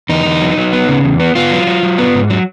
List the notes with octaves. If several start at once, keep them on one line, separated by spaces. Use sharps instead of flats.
E2 D#4
E2
F#3
F#3
B3
C#3
E2
B3
B3 F4
F#3
F#3
F#3
B3
G#2
F#3